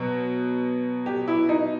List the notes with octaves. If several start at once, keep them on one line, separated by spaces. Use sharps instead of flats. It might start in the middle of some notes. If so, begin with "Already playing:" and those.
Already playing: B2 F#3
G4
E4
D#4